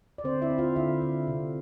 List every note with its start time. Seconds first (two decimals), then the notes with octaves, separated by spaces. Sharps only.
0.18 D5
0.24 D3 C4 C5
0.42 E4 E5
0.50 C4
0.58 F4 F5
0.76 D3 E4 E5
1.02 D3
1.27 C3